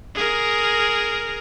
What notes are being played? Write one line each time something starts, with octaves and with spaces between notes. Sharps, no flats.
G#4 A#4